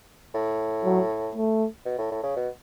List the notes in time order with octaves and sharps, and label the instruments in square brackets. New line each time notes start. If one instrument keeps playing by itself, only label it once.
[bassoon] A2
[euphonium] F#3
A3
[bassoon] B2
A2
A2
C#3
B2